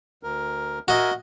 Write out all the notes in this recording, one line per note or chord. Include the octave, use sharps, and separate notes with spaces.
D2 A#4
F#4 A#4 D#5 E5 G#5